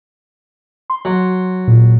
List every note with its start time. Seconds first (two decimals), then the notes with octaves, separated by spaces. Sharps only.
0.90 C6
1.05 F#3
1.68 A#2